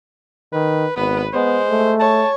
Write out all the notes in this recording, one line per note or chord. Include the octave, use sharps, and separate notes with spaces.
D#3 B4
G#1 B3 B4
G#3 B3 C5
A3
C#5 A5